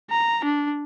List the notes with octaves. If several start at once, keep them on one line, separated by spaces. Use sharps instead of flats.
A#5
D4